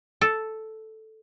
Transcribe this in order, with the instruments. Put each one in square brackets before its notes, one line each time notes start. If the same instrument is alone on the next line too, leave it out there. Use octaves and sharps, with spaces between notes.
[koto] A4